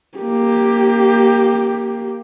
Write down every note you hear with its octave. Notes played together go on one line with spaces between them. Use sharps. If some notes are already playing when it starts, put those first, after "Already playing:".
A#3 G4